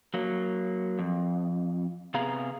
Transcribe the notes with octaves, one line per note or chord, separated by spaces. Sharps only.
F#3 A#3
F2
C3 B3 G#4 F5 A#5